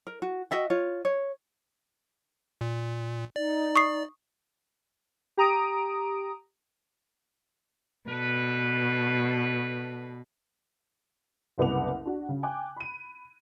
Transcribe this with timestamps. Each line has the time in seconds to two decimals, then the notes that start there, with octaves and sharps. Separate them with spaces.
0.07 A#4
0.22 F#4
0.51 F#4 D#5 E5 G5
0.70 F4 C#5
1.05 C#5
2.61 A#2
3.36 D#4 D5
3.76 C#6 D#6 C7
5.37 G4 A#5 D#6 D7
8.08 B2 D4 A4 B4
11.58 F#1 C2 B3 F#5 D6 F7
12.05 D4 F#4
12.29 C#3
12.43 G5 G#5 D6 F#6
12.76 B5 D#7